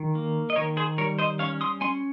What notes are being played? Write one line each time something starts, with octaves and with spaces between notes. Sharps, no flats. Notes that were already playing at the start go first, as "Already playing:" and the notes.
Already playing: D#3
A#3
D#5
D#3 A#4 C#5
G#4 C5
G3 A#4 C#5
C5 D#5
C#4 C#5 F5
C6 D#6
C#4 G#5 C6